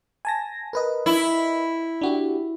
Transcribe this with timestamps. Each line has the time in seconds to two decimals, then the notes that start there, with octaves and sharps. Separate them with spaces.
0.25 G#5 A5 A#6
0.73 A#4 B4 D#5
1.06 E4
2.01 D4 F#4 G4